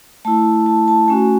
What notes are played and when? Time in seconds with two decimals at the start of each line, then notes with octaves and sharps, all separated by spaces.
0.25 A3 E4 A5
0.66 A5
0.88 A5
1.08 A3 C#4 F#4 G#5